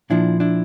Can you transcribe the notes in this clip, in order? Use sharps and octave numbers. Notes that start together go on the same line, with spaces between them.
A#2 F3 D4 E4
D4 E4